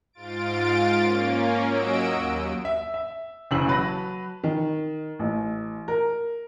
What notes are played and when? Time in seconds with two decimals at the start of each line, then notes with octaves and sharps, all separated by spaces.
0.13 G#2 F4 A6 D7
1.00 A#3 C#4
1.67 F#3 F#4 D#5 E6 D7
2.11 D#2
2.65 E5
2.94 E5
3.51 F#1 C#3 E3 E6 F#7
3.68 F#3 B4 A5 A#6
4.44 D#3
5.19 A1
5.88 A#4